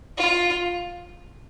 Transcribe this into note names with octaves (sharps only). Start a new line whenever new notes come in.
F4